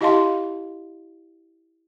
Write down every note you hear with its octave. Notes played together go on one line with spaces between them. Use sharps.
E4 G4 D#5 F5 A5 C6